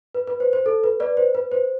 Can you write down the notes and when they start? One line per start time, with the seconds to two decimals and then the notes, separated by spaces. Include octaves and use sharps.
0.15 B4
0.27 B4
0.40 C5
0.53 C5
0.66 A4
0.84 B4
1.00 B4 D5
1.17 C5
1.35 B4
1.52 C5